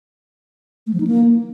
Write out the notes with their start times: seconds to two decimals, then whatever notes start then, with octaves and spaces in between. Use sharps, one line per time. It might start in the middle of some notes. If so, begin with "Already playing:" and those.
0.87 A3
0.94 F3
1.00 D#4
1.07 A#3